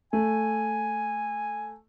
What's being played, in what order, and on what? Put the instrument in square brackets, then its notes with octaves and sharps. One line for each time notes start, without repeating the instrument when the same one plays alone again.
[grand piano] A3 [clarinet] G#5